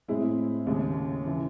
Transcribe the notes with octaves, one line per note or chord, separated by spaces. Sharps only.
A2 G#3 C4 E4 G#4
D#2 C#3 G#3
C#3 E3